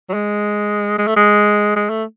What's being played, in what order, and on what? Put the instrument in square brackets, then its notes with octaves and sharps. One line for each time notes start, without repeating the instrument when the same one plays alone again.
[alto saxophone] F#3
G#3
G#3
A3
G#3
G#3
A3